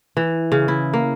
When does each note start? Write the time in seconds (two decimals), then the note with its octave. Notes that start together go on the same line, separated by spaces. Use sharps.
0.17 E3
0.52 C#3
0.68 E4
0.93 A#3